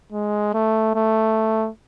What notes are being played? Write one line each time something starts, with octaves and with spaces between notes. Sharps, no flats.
G#3
A3
A3